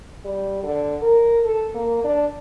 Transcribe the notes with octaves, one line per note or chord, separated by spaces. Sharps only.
G3
D3
A#4
A4
A#3
D4